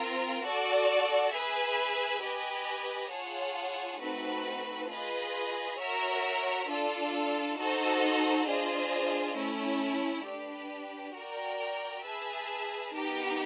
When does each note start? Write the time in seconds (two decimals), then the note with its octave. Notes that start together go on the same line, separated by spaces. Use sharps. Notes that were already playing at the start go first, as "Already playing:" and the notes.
Already playing: C4 F4 A#4
0.43 F#4 A4 D5
1.32 G#4 B4 E5 G#5
2.23 G4 B4 D#5 G#5
3.11 F4 G#4 C#5 F#5 A5
4.01 A3 C4 D#4 F#4 B4
4.90 F4 G#4 B4 D#5
5.79 F#4 A#4 C#5 E5
6.68 D4 F4 A4
7.58 D#4 F#4 A4 C5 D#5
8.47 D4 F4 G#4 C5 D#5
9.36 A3 C#4 E4
10.26 D4 G4 B4
11.15 F#4 A#4 D5 G5
12.05 G#4 B4 E5 A5
12.94 B3 D#4 G4 A#4